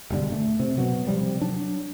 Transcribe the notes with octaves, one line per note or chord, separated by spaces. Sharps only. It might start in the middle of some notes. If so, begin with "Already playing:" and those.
E1 G2 D3
A3
C3
B2 F#3
C3 F3 G3
F#3 D4